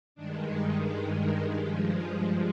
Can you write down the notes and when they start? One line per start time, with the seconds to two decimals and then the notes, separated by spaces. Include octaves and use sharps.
0.15 G2 D#3 G#3 D4
0.50 D#4
0.86 D#4
1.22 A#4
1.57 G2 F3 G#3 G4
1.92 F4